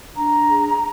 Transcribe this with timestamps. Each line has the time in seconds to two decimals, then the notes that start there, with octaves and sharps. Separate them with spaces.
0.16 D4 A#5
0.50 G#4